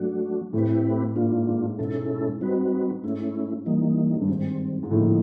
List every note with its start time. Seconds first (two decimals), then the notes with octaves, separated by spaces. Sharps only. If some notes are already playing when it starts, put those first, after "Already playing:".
Already playing: G#2 F#3 A3 D4 F#4
0.53 A2 A3 C4 E4 G4 B4
1.15 G#2 A#3 D4 F4
1.48 G#2
1.78 G#2 B2 G#3 C#4 E4 A4
2.41 G3 C4 D#4 F#4 B4
3.03 G#2 A3 C#4 E4
3.66 E3 G3 A#3 D#4
4.21 G2
4.28 G#2 D#3 G3 C4
4.83 G#2
4.91 A2 D3 F3 A#3 D#4